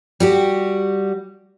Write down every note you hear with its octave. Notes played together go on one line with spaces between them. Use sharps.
G3 F#4 G4